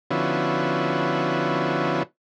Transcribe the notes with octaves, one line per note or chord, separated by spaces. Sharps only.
D3 F3 B3 C#4 E4 F#4